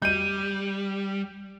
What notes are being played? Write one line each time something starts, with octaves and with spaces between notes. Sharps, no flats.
G3 G6 D#7